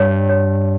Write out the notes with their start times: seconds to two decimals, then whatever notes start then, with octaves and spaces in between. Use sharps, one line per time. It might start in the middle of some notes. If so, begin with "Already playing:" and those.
Already playing: G2 C#5
0.29 C#5